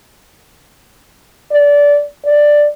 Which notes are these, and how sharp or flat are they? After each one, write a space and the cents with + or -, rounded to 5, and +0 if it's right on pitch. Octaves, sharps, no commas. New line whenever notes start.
D5 -20
D5 +5